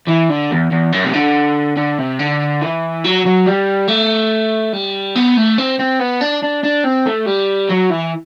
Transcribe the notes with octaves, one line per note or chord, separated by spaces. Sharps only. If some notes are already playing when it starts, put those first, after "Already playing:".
E3
D3
E2
E2
F#2
C3
D3
D3
C3
D3
E3
F#3
F#3
G3
A3
G3
B3
A3
C4
C4
B3
D4
D4
D4
C4
A3
G3
F#3
E3